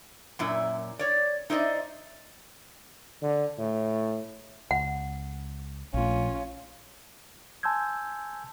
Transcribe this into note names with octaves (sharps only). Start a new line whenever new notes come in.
F#2 A#2 E4
C#5 D5
D#4 E4 C5 D5 D#5
D3
A2
C#2 F#5
A#1 A3 C#4 F4
G#5 A5 C6 E6 G6 G#6